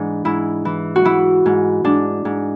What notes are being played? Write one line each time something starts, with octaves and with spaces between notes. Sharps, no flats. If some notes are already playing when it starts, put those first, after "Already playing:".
Already playing: G#2 E3 D4
G#2 E4
E3
F#4
E3 E4
G#2
G#2 D4
G#2